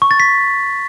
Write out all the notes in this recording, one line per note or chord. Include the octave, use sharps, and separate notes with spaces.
C#6
A6
B6